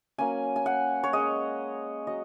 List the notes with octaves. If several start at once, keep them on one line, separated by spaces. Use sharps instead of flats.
F#3 A#3 C#4 G#5
G#5
F#5
C#5
G#3 C#4 D#5
F#3 D#5